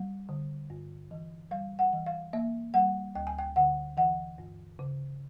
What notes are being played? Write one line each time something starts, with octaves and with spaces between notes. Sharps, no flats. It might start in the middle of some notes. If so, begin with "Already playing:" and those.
Already playing: G3
D3
G2
E3
G3 F5
F#5
E3
F5
A#3 E5
G3 F#5
D2 G5
G#5
G5
D3 F#5
E3 F#5
G2
C#3